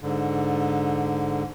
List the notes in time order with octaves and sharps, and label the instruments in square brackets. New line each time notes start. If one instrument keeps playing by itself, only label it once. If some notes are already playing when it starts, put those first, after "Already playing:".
[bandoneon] G#2 D3